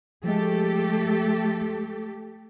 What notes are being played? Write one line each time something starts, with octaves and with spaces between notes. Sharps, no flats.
F3 G#3 A3 G4 A4